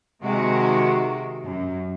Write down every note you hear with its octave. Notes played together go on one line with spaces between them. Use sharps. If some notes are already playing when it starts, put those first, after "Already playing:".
C3 D#3 G#3 F#4
F#2